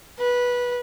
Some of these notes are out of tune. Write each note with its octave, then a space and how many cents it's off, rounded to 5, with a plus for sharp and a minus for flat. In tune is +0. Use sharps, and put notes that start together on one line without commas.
B4 -15